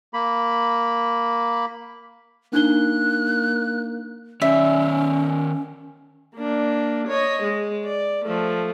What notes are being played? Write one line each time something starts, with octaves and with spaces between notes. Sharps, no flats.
A#3 B5
A#3 D4 D#4 F#6 G7
D#3 C#4 C#5 D5 E5
A#3 D4
C#5 D#5
G#3
D5
F3 A3